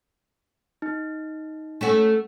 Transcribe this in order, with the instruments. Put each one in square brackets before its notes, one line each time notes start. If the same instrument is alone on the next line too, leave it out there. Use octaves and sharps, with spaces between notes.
[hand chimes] D#4
[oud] A3 C#4 F#4